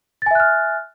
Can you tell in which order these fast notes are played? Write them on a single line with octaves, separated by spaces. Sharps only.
A6 G#5 E5 F#6 F6